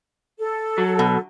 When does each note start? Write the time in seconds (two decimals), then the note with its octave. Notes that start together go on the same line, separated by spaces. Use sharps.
0.40 A4
0.78 F#3
0.99 B2